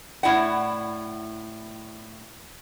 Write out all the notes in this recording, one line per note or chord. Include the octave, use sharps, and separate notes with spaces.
A2 E4 D5 F#5